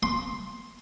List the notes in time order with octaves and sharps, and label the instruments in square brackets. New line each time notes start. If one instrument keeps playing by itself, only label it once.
[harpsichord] C6